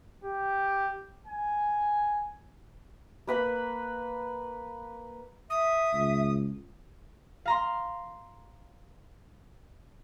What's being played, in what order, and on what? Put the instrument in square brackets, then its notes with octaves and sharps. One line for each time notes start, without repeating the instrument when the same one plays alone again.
[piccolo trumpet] G4
G#5
[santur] A#3 B4 B5
[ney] E5 [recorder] D#6
[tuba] C#2
[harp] F5 A#5 C6